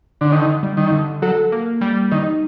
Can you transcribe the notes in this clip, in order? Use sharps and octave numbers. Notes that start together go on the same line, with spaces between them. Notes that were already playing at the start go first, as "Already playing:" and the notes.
D3
D3 D#3
G3
D#3
D3
F#3 A4
A#3
G3
D#3 D#4